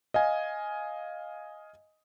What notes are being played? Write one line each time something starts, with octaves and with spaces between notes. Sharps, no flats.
D#5 F5 G#5